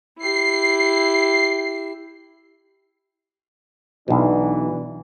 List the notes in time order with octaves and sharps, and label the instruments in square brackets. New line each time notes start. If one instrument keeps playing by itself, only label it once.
[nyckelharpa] E4 G4 [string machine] C7
[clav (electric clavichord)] B1 B2 [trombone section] E3 D4